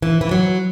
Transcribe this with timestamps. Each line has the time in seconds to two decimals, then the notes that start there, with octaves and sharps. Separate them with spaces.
0.02 E3
0.21 E3
0.31 F#3